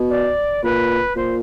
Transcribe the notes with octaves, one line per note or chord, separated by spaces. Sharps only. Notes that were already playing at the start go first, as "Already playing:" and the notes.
Already playing: B2
D5
A#2 B4
A#2 C5